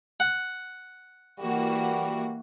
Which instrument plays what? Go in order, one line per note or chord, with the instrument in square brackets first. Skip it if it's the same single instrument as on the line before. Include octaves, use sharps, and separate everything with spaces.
[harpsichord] F#5
[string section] E3 A#3 F#4 [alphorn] G3